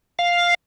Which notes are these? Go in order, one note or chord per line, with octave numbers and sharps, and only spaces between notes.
F5